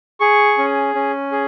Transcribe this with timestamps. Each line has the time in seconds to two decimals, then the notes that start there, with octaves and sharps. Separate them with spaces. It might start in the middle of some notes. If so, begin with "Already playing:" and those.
0.20 G#4 C#6
0.58 C#4
0.95 C#4
1.32 G#4